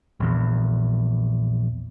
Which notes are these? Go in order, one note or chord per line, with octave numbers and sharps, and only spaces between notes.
A#1 E2